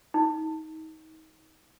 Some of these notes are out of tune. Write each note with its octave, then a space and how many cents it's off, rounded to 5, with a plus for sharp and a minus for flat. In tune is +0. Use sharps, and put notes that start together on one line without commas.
D#4 +30